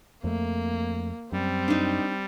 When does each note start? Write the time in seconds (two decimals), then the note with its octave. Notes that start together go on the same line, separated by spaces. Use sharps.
0.24 F2 A3 A#3
1.32 F#2 G3 C4
1.68 D4 D#4